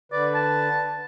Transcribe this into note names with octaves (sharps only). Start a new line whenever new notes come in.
D3 B4 D5
A5